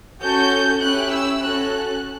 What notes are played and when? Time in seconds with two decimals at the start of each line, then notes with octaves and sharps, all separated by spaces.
0.22 C#4 F#4 A4 G6
0.82 C#4 E4 G4 F#6
1.12 E6
1.41 C#4 F#4 A4 F#6